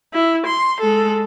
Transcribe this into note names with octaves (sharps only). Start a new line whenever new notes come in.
E4
C6
G#3 A4